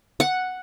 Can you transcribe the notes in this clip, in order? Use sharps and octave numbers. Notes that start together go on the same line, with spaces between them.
F#5